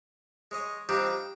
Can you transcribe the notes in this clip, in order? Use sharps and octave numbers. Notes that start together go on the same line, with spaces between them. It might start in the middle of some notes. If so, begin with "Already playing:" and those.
G#3 C#5 D#5
G3 C4 D4 D#4 F4 G4
G5